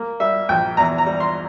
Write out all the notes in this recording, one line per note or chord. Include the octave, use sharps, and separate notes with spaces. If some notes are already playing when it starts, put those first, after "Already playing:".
Already playing: A#3
G3 E5
A#1 G5
E2 A#5
A#5
G3
C6